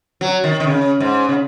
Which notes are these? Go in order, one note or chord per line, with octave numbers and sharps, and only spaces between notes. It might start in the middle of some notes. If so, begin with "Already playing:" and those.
F#3
D#3
D#3
C#3
G#2
C#3